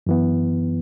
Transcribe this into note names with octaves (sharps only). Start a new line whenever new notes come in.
F#2 E3 B3